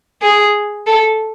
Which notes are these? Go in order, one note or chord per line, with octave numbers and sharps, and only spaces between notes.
G#4
A4